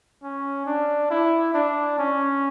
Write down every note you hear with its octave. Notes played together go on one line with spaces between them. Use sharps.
C#4
D4
E4
D4
C#4